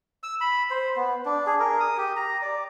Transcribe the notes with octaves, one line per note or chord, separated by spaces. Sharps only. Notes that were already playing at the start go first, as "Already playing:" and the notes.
E6
B5
C5
B3
D4
G#4
A#4
D#6
G4
A#5
D5